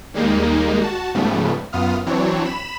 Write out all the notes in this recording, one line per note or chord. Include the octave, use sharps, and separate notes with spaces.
D#2 G3 G#3 A#3 D#4
F#4 A5
G#2 C#3 F3 G3 A3 B3
F#2 B3 F4 D#6 F6
E3 F#3 C4 D4 C#5
B5 E7